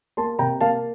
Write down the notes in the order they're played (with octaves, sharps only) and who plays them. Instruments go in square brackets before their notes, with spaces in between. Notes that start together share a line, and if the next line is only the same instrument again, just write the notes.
[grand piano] A#3 A5 C6
C3 G5 A#5
A#3 F5 A5